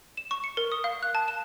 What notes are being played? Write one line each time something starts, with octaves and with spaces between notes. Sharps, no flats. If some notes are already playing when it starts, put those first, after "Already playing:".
E7
C#6
C#7
A#4
D#6
F5
F#6
A5
E7